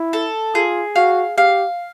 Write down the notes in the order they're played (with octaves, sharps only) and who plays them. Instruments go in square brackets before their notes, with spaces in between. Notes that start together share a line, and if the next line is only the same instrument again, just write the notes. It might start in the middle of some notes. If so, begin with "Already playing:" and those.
Already playing: [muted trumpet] E4
[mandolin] A4
[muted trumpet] F4 [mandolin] G#4
[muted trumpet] F#4 [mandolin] F5
[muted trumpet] G4 [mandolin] F5